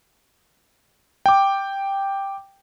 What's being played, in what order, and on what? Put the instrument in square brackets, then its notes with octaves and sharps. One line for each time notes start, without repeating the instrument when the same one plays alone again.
[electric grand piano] G5 D6